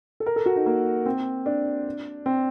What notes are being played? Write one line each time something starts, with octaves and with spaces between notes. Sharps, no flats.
A4
A#4
A4
F#4
D#4
A#3
C4
D4
C4